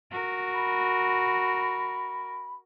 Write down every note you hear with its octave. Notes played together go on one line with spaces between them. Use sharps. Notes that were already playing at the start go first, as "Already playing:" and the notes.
F#4 A#4
B5